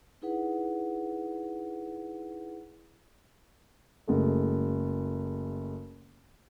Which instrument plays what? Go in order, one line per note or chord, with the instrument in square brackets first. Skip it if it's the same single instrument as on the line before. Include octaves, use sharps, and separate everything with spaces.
[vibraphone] D#4 E4 G#4 B4 F#5
[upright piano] F#1 G#3 A3